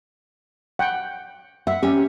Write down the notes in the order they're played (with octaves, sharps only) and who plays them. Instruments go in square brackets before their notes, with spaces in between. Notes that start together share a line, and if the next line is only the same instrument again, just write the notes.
[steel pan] F#5 G5
[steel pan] E5 [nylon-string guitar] F#5
[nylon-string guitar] C#4 [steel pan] G4